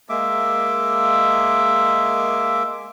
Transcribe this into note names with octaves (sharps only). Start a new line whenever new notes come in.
G#3 A#3 E5 D6